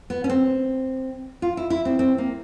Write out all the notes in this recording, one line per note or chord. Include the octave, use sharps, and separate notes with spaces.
B3
C#4
C4
F4
E4
E4
C4
C4
A#3